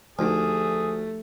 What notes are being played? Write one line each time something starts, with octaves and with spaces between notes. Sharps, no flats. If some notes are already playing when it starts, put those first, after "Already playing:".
D2 F3 A3 D#4 G4 G#4